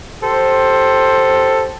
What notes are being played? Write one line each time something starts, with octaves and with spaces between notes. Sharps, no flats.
G4 A4 C5